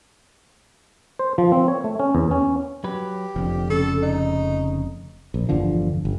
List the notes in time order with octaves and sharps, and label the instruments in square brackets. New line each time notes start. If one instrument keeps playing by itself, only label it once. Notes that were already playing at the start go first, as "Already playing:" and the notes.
[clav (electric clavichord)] C5
F3
C4
C#5
A3
C#4
E2
C#4
[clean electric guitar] F#3 B4 [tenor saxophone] G4
[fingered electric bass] F1 F2 D3 [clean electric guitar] F3
[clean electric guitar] C#3 [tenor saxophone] A4
[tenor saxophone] D#4
[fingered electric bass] A#1
G1 E2 D3 F3
G1